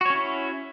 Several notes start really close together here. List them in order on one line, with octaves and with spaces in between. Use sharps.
F#4 C#5 C#4 E4